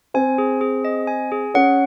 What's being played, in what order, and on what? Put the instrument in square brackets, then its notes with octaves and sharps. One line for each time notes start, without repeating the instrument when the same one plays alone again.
[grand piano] C4 [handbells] G#5
[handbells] G#4
G#4
D#5
G#5
G#4
[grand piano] C#4 [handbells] F#5